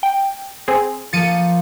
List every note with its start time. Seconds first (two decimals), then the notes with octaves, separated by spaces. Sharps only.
0.03 G5
0.68 C4 G#4
1.13 F3 A#3 A6 C#7 D#7